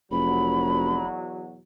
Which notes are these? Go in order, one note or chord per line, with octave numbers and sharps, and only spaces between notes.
F1 E2 B2 F#3 B5